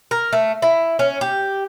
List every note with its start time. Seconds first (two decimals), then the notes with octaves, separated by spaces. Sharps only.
0.11 A#4
0.33 A3
0.62 E4
0.99 C#4
1.21 G4